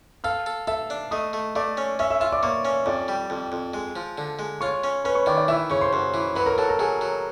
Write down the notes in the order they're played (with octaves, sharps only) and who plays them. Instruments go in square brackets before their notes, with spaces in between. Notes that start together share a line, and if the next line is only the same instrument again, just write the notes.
[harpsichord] A4 [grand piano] F5 F6
[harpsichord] A4
[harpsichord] A4 [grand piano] E5 E6
[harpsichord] D4
[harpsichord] A3 [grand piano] D#5 D#6
[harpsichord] A3
[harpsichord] A3 [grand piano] D5 D6
[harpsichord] C#4
[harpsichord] C#4 [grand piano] E5 E6
[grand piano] E5 E6
[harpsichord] F4 [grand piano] E5 E6
[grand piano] D5 D6
[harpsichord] A#3 [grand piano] C#5 C#6
[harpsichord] C#4
[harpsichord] F2 [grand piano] D5 D6
[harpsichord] G3
F2
F2
G#3
F3
D3
G#3
[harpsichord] F4 [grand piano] C#5 C#6
[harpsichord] C#4
[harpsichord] C#4 [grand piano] B4 B5
[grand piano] C#5 C#6
[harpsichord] D#3 [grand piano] D5 D6
[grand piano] D5 D6
[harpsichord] E3 [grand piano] E5 E6
[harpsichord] C#3 [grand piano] C#5 C#6
[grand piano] C5 C6
[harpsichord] F#2 [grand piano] C5 C6
[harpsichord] E3
[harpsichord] F#3 [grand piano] B4 B5
[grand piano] A#4 A#5
[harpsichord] F#3 [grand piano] A4 A5
[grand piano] A#4 A#5
[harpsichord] F#3 [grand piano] G#4 G#5
[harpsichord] F#3